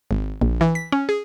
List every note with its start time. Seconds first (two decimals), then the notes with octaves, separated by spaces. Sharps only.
0.11 G#1
0.41 A#1
0.61 E3
0.75 B6
0.92 C#4
1.09 G#4